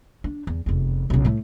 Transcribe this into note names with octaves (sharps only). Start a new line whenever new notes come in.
D4
E2
F1 E2
B1 C#3
A2 A3